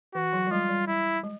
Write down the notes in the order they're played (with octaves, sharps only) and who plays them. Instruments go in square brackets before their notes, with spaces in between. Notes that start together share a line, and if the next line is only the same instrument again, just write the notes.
[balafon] E3 [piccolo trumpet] F#4
[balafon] F#3
G3
[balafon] G#3 [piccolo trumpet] F4
[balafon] G3
[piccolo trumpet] E4
[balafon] G#3